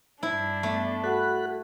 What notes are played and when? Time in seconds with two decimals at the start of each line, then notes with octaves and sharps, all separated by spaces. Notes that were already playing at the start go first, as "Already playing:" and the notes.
0.23 G2 D4 E4
0.63 A3 B3 E5
1.04 F#4 A4 F#5 B5 F#6